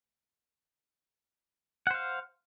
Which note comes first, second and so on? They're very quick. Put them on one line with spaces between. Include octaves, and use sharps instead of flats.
F#5 C5 F5